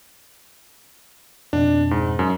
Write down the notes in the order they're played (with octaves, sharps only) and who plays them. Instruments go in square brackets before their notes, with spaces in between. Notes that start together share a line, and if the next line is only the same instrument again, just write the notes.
[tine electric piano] F2 B2 [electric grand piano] D4
[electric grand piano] G#2
F#2